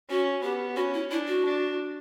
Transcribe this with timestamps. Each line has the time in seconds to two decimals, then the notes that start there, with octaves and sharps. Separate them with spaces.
0.09 C#4 F#4
0.43 B3 G4
0.76 C#4 F#4
0.94 E4
1.11 D4 E4
1.28 F#4
1.45 D4